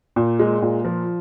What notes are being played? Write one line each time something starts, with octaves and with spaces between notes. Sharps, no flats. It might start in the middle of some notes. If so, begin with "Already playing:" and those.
A#2
G#3
A#2
F3